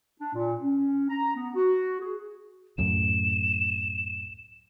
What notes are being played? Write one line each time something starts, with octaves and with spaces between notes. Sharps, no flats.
D4
A#2
C#4
A#5
B3
F#4
G#4
C#2 F#2 A2 E7